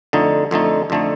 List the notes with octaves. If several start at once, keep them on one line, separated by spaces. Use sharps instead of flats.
F2 D3 A3 D#4
F2 D3 A3 D#4
F2 D3 A3 D#4